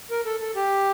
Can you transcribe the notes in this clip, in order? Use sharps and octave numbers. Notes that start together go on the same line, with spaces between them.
A#4
A4
A4
G4